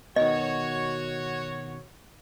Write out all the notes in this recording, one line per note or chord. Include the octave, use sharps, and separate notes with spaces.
B2 D#3 F#4 C#5 D#5